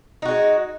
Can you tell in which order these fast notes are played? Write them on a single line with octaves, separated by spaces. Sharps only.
D#4 F#4 G#3